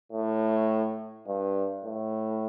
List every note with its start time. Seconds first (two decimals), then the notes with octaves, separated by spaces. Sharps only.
0.12 A2
1.28 G2
1.84 A2